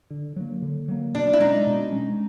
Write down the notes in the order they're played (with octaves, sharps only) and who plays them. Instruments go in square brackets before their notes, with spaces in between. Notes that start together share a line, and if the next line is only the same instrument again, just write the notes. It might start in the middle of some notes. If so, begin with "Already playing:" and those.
[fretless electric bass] D3
F#3 A#3
D3
F#3 A#3
[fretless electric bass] B2 [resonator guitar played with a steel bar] D4
[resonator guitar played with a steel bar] E4
[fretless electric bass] G#3 C#4 [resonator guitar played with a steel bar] D#4
[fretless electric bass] B2
G#3 C#4